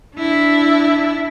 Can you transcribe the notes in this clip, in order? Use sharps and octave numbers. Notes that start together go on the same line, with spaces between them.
D4 E4